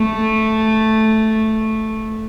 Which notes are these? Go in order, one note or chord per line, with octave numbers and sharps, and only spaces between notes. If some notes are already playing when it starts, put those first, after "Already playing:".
Already playing: A3